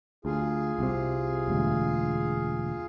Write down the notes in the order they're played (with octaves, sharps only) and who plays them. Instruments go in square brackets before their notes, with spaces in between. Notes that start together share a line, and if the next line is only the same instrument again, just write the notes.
[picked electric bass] D2 [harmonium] F4 G#4
[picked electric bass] C2 C3
E1 D2